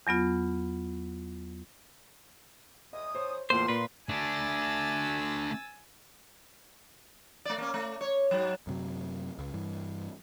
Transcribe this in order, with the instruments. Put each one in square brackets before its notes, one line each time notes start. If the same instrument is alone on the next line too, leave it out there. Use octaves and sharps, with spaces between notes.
[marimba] E2 F#3 B3 F4
[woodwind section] E2 D#6 [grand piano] D#5
[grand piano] C5 C#5
[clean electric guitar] E2 A2 C5 [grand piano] A#3 F4 [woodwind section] C6
[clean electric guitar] A#2 B4
[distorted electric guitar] A3 D4 [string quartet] G#5 E6 A6
[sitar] A3 D5
A#3 C#4
A3
C#5
G#2 F#3
[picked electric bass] F#2 C3 F#3
C#2
G2 E3